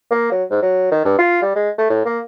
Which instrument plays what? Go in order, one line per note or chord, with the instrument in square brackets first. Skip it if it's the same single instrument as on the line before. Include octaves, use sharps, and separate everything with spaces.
[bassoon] A#3
F#3
G#2
F#3
D#3
G2
F4
G3
G#3
A3
A2
A#3